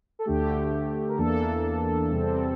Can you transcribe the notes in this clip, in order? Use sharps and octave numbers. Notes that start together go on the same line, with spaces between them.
A4
D2 D3 A3 G4
A#4
E2 E3 A#3 D4 A4
E2 C3 G3 C4